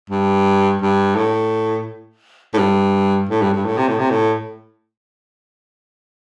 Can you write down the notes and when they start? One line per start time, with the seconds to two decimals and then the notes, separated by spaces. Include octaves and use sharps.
0.10 G2
0.82 G2
1.16 A2
2.54 A2
2.58 G2
3.29 A2
3.42 G2
3.54 G2
3.65 A2
3.77 C3
3.88 A2
3.99 C3
4.10 A2